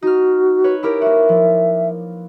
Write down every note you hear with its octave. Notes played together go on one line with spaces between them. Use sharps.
D#4 F#4 F6
B4 C#5
E4 G4 A#4
A#3 F#4 E5
F3